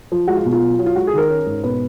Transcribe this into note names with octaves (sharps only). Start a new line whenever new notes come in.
F3
G#3 F#4
F4
B2
F4
F#3
F#3
F4
G#3 F#4
G#4
D#3 A#4
C#4
G#2
B2 B4